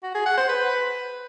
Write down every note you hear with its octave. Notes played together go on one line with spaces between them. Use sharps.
F#4
G#4
F#5
C5
B4